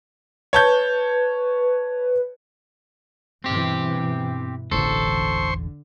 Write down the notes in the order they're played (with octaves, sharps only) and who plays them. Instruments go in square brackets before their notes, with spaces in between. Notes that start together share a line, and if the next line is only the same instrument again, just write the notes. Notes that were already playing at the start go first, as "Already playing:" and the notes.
[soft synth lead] B4 [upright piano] C#5 A5 G6
[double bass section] G2 B2 E3 [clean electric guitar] C4 G4
[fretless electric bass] E1 A1 E2 [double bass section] D3 [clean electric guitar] A4 [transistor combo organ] C5 C6 C#6